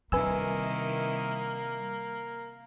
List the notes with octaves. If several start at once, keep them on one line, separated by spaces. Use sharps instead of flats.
C3 D#3 G3 A#3 E4 B4 G#5 E6